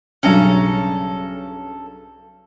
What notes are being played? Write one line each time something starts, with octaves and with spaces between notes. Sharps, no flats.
B1 G2 C#3 C#4 A4 A#5